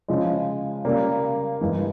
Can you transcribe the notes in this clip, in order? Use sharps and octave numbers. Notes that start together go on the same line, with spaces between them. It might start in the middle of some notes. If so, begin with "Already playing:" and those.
C#3 F3 G#3
C#3 G3 A#3
G1 G2 E3 G#3